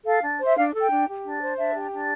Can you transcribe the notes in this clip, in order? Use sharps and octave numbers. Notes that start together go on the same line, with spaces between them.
A4 F5
D4
C5
E5
D4 F5
A4
G5
D4
G4
D4
C5
D4 E5
G4
D4